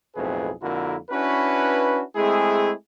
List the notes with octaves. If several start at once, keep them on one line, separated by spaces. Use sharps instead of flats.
B1 F2 A2 C4 G#4 B4
F2 D3 A#3 E4 F#4 A#4
C#4 D4 E4 F#4 B4
G#3 A3 C4 E4 G#4